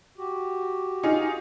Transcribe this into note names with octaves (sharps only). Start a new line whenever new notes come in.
F#4 G4
D#4 F4 G#4